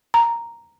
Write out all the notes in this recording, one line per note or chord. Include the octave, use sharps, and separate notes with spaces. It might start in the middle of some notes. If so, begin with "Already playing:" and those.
A#5